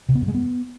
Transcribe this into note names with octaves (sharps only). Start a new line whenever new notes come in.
C3
B3
F#2
G#3
B3